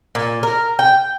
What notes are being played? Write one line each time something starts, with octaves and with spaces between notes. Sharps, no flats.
A#2
A#4
G5